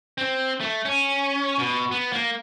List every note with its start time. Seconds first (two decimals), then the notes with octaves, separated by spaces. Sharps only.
0.18 C4
0.60 A3
0.85 C#4
1.59 B2
1.91 B3
2.13 A#3